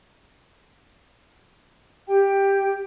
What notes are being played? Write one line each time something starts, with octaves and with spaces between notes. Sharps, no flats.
G4 G5